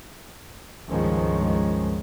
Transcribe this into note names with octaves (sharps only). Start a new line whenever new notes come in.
C#2 G2 D#3 F3 G#3 C#4